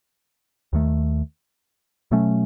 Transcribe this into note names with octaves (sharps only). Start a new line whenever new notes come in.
D#2 D#3 A3
B2 F#3 A3 C#4